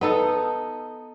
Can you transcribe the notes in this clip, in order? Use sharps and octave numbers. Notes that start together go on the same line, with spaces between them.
B3 D#4 A4